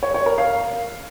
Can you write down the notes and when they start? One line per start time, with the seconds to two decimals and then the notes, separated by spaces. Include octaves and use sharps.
0.03 C#5
0.14 C#5
0.26 A#4
0.38 F5